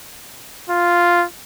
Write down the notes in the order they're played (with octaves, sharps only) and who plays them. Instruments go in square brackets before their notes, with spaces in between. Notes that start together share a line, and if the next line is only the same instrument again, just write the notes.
[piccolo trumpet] F4